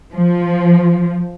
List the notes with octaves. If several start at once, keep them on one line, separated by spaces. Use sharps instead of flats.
F3